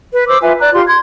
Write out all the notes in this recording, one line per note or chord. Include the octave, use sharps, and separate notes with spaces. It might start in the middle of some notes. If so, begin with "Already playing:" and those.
B4
C5 D6 E6
F4 B4 E5 G#5
D5 A#5 F#6
F4 G4 C6
C6 G#6